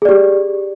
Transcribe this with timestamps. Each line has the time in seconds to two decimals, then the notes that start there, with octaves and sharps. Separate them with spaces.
0.02 G#4
0.05 D5
0.09 G4